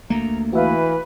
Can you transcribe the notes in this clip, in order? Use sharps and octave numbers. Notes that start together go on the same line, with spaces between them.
D2 A3 A#3 A#5
E3 F#4 B4 E5 F5